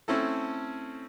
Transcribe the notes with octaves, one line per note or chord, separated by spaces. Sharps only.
A3 C4 C#4 E4 A4